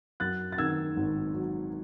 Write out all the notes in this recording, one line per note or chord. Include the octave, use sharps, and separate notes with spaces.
F#2 F#6 A6
A6
D#3 E6 G#6
G#1
F#3